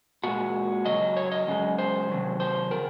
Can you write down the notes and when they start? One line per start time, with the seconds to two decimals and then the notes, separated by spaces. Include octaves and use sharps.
0.23 A#2 G#3 F#4
0.85 F#2 C#3 F#3 D#5
1.17 C#5
1.32 D#5
1.47 F#2 C#3 G#3
1.78 C5
2.09 C3 D#3 F#3
2.40 C5
2.71 C#3 A#4